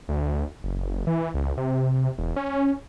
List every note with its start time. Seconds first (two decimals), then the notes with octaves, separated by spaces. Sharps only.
0.09 D2
0.64 F#1
1.07 E3
1.34 C#2
1.57 C3
2.19 E1
2.36 C#4